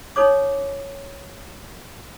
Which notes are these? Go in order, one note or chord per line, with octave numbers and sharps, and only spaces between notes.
D#4 A4 C#5 D6